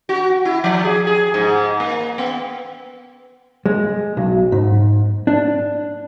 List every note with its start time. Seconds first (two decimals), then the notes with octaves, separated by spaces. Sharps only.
0.09 F#4
0.45 E4
0.64 F3
0.84 G#4
1.07 G#4
1.34 G#2
1.80 A#3
2.18 B3
3.66 G#3
4.17 B1
4.52 G#2
5.27 D4